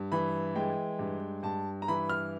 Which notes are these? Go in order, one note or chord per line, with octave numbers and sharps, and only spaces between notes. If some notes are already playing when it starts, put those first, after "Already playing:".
Already playing: G2
E3 B5
G#3 G5
G2
G2 A5
A#5
E3 B5
F6